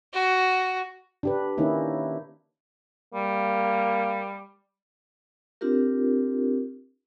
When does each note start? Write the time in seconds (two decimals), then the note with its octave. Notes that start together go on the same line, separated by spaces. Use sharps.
0.13 F#4
1.23 D4 G4 B4
1.58 D#3 A#3 C#4 D#4 E4
3.15 G3 A#3
5.61 C4 D4 F4 G4 A#4